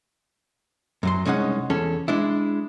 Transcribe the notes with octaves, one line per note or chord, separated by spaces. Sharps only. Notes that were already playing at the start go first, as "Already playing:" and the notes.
F#2 F#3 C6
C2 G#3 C#4 D#4 F#5
E2 C#4 A4
G#3 D4 E4